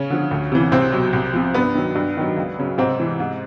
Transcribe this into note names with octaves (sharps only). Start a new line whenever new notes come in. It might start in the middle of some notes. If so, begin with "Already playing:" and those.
Already playing: C#3 C#4
D3 F3
D2
C3 E3
C2 C3 C4
B2 F#3
C2
C3 F3
G2 B3
D#3 F#3
G2
D#3 F#3
C#2
C#3 F#3
G#2 C3 C4
E3
G#2